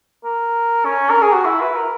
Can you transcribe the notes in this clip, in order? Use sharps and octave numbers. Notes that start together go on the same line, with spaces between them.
A#4
C#4
A#4
G#4
F#4
E4
B4
A#4